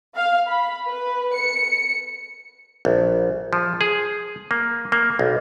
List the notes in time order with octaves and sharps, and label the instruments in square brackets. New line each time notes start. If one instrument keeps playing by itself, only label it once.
[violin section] F5
B5
B4
C#7
[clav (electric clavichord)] A#1
F3
G#4
A#3
A#3
B1